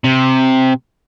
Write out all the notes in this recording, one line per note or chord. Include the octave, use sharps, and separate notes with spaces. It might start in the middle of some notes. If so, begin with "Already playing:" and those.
C3